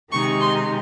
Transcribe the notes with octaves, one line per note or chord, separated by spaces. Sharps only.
C3 D#3 G#3 D#4 C#6
C6